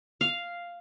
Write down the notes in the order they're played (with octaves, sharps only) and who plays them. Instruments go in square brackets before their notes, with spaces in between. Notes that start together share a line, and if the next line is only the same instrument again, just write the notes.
[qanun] F5